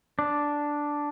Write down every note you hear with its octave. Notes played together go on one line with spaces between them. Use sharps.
D4